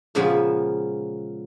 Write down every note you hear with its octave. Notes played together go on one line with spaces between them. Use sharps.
A#2 C#3 F3 G#3 B3